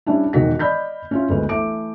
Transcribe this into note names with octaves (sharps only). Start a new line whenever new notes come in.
G3 C#4 D4 E4
E1 D#3 F#4 B6
D5 D#5 B5 F6 G6 B6
C#4 E4 F4
G1 D2 G#3 B4
E3 A3 E5 D6 D7